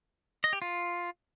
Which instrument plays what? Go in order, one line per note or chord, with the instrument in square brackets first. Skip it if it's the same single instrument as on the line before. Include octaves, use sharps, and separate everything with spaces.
[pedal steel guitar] D#5
G4
F4